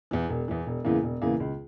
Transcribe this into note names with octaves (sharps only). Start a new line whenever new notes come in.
E2 E3
E1
E2 E3
E1
E2 C#3 E3 A#3
E1
E2 C#3 E3 A#3
C#2